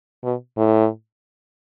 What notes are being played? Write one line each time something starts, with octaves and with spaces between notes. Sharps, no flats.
B2
A2